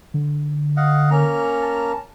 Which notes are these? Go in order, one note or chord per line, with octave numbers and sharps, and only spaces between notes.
D3
D#5 F5 F#5
A#3 C#4 A#5
A5